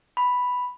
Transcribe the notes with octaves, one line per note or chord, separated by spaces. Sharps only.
B5